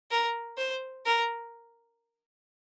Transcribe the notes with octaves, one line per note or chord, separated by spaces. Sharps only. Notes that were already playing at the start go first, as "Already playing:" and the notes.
A#4
C5
A#4